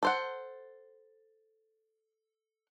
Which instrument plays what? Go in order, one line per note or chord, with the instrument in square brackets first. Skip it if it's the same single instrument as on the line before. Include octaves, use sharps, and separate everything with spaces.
[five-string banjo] A4 C5 F#5